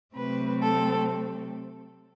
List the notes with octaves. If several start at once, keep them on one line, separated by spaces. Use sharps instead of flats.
C3 F#3 A3 C4 B4
A4